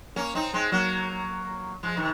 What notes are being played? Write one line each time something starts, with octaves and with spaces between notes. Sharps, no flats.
A#3 C#4
C4 D#4
G#3 C4
F#3 A#3
F3 G#3
C3 D#3